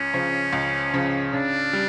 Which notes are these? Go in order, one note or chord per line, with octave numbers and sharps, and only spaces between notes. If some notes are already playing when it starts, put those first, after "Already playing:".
Already playing: C#2 C#4
C#3 F3
C#2
C#3 F3
C#3 D4
G3